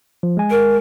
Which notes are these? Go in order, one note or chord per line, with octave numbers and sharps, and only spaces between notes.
F3
G#3 G#5
A#4